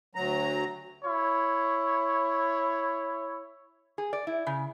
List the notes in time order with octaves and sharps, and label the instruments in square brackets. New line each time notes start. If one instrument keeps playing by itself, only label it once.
[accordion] D2 F#3 A#5
[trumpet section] E4 C#5
[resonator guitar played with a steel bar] G#4
D5
E4
C#3